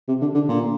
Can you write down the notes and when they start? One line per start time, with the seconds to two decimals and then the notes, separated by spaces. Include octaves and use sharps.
0.08 C3
0.21 D3
0.34 D3
0.48 A#2